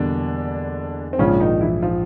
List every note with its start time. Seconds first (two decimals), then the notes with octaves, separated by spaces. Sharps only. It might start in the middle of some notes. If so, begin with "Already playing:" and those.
Already playing: E2 B2 D3 G3 A#3 D4
1.13 C4
1.19 A#1 G#2 C#3 F3 C#4
1.40 D#3 D#4
1.61 E3 E4
1.82 F3 F4